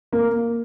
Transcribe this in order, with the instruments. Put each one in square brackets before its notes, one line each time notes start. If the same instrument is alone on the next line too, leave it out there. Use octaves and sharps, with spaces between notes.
[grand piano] A#3